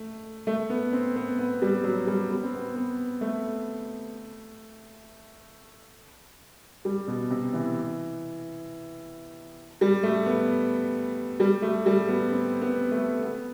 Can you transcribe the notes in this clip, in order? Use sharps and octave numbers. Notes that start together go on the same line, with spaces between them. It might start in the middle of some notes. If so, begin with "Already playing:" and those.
Already playing: A3
A3
B3
C4
B3
B3
G3
F#3
G3
B3
C4
B3
B3
A3
G3
B2
C3
E3
G3
A3
B3
G3
A3
G3
B3
C4
B3
A3
B3